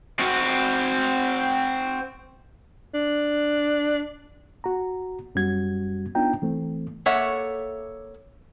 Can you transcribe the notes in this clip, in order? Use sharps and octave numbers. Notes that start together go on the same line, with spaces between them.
C4 F#4
D4
F#4 A#5
F#2 G3 C#4 F#4 G#6
B3 D4 D#4 F4 G5 A#5
E3 A3 C4
A#3 A4 C#5 E5 F#5